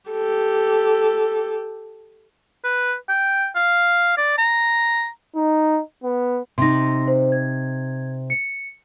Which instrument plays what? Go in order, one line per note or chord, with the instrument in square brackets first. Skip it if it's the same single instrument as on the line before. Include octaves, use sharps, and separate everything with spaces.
[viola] G4 A4
[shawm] B4
G5
F5
D5
A#5
[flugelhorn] D#4
B3
[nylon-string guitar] C3 D#4 [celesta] C6 A#6
[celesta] C5
G#6
C#7